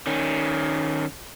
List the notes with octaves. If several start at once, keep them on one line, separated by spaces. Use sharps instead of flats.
D#3 C#4